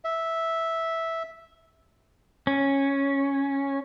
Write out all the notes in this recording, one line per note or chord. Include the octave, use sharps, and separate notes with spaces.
E5
C#4